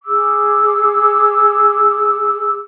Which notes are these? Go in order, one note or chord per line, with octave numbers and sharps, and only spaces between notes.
G#4 D6 E6